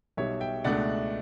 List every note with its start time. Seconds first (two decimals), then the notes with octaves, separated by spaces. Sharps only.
0.17 B1 B2 G3 C#5 E5
0.40 E5 G5
0.64 C#2 B2 A3 D4 D5 F#5